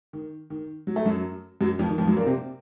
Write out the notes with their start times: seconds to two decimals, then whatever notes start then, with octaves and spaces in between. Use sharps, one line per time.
0.13 D#3
0.50 D#3
0.87 F#3
0.96 A3
1.05 F#2 F#3
1.61 F#2 F#3
1.79 F2 F3
1.89 D#3
1.98 F2 F3
2.08 F#2 F#3
2.17 A#2 A#3
2.26 C3 C4